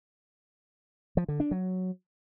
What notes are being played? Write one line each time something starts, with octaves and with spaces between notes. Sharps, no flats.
F3
D3
D4
F#3